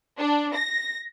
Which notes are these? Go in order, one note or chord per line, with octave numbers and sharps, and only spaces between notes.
D4
A#6